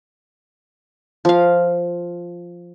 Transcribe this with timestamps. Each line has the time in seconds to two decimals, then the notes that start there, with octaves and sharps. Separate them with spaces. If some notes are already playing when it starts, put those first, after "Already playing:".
1.25 F3 F5